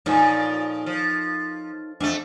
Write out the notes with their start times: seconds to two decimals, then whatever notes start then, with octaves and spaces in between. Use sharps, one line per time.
0.06 A#2 F3 D#4 A4 C#5
0.86 F3
2.00 F2 A3 D4